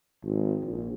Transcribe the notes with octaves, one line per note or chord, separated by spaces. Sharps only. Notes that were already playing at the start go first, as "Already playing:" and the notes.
G#1
A#1